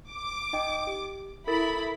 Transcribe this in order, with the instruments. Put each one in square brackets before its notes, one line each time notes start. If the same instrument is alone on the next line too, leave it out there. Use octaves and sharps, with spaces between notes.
[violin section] D6
[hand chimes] D#4 D#5 G5
G4
[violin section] E4 B5 [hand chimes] A4 A#4 A6